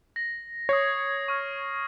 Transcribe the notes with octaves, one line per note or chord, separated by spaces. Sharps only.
A#6
C#5 D#6 G#6 C7
C#6 F6